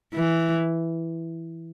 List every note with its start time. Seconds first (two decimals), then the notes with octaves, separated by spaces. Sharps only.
0.14 E3